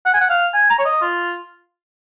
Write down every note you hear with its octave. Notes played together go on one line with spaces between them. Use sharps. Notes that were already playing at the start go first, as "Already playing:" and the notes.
F#5
G#5
F#5
F5
G#5
A#5
C#5
D#5
F4